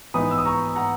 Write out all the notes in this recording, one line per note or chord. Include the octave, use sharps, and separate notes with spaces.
G#2 E3 B3 D#4 B5 D#6
E6
D#6
A#5 C#6
F#5 A#5